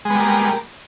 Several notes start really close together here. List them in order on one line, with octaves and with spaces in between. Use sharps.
G#3 B3 G3 A#3